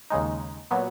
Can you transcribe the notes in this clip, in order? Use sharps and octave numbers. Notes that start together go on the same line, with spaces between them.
D#2 C#3 G#3 D#4
A#2 F#3 B3